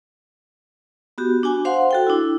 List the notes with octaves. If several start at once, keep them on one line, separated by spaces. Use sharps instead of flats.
B3 F#4 G4
D4 F#4 G#5 D6
C5 F5 F#5 C6
F#4 A4 G5
D4 E4